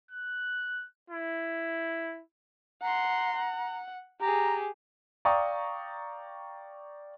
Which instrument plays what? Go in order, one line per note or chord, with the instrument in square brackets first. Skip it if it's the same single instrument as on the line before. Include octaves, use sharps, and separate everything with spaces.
[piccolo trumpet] F#6
E4
[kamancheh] F#5 C6 [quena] A#5
[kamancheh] F#5
[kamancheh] G4 G#4 [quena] A#5
[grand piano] D5 F5 G5 A#5 C#6 D#6